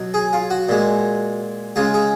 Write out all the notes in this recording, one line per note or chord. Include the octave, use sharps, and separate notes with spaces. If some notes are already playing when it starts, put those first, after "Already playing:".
Already playing: B2 F#3
G#4
F4
F#4
A#2 G#3
C#3 G#3 F4
G#4